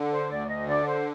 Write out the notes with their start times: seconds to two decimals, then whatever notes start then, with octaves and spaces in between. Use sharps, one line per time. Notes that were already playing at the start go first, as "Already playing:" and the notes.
Already playing: D3
0.11 C5
0.29 D2 D5
0.48 D#5
0.66 D3 D5
0.86 C5